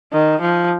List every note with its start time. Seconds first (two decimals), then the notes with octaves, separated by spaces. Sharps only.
0.13 D#3
0.41 F3